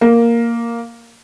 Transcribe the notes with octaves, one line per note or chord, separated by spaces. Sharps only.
A#3